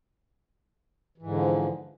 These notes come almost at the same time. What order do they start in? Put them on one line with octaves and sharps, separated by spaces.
E3 G#2 D3 F3